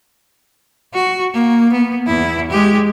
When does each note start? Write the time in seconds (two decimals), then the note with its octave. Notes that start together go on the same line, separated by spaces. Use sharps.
0.94 F#4
1.34 A#3
1.73 B3
2.07 E2 E4
2.51 G#3 G4